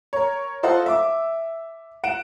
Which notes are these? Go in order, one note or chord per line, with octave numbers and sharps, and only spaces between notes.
A#4 C#5
F4 A4 C5 D#5 F5 F#5
E5 D6
F#5 D7 E7